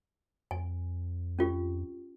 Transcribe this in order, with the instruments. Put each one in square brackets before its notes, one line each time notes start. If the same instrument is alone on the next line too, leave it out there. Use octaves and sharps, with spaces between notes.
[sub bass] F2 [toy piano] G#5
[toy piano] C#4 F4 G4